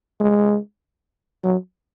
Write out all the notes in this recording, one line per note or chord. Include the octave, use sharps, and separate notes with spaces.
G#3
F#3